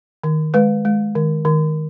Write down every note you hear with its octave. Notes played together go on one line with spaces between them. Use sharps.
D#3
G#3 B4
G#3
D#3
D#3